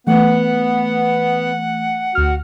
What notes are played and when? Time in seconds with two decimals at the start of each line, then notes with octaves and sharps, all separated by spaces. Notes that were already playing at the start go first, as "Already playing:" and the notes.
0.07 E3 A3 B3 F#5
2.15 D2 F#4 F6